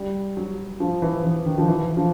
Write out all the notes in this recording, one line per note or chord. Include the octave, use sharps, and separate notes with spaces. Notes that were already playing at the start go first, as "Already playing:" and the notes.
Already playing: G3
F#3
F3
E3
E3
D#3
F3
E3
F3